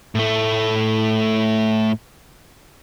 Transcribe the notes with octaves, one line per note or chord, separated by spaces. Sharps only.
A2 A3